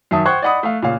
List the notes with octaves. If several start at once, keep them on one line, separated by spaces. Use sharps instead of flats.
F#2 D#3 E5 A5 D#6
C5 F#5 G5 C#6 F#6 G#6
D5 D#5 F#5 B5 D#6
A3 F5
A#2 C#3 F5